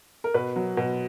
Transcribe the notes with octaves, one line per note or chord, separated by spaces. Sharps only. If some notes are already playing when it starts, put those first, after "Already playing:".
A#4
B2 B4
F#3
B2